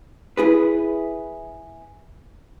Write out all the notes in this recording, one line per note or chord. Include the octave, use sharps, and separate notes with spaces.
E4 G#4 B4